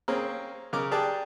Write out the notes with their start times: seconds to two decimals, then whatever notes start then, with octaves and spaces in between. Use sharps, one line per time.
0.08 A#3 C4 C#4 G#4
0.73 C#3 A#4 D6
0.91 G4 G#4 D5 A5 F#6